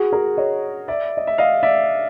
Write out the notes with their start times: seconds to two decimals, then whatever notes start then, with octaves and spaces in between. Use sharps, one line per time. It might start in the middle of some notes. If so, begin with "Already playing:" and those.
Already playing: F#4 G#4
0.12 G#4 A#4
0.37 C#5 D#5
0.88 D5 E5
1.17 D#5
1.27 E5
1.38 D#5 F5
1.63 D5 E5